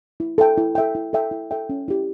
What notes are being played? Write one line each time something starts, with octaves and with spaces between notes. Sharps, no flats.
E4
A4 E5 G5
E4
A4 E5 G5
E4
A4 E5 G5
E4
A4 E5 G5
C#4
E4 G4